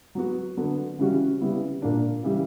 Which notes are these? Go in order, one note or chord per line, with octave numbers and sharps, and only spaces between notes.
F#3 B3 F#4
D3 F#3 B3
C#3 E3 G3 C#4 F#4
C#3 G3 B3 E4
A#2 A#3 D4
C#3 E3 G3